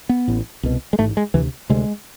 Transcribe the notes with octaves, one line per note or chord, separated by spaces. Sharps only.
B3
A1 A2
C2 B2
G#3
A1 G#2 A3
G#3
D2 C3 E3
D2 C3 G#3